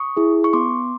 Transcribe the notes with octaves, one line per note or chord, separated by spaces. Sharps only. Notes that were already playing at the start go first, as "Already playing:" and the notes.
Already playing: C#6 D#6
E4 G#4
C#6
B3 C6 D6